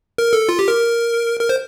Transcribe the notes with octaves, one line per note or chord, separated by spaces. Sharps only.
A#4
A4
F4
G4
A#4
A#4
C5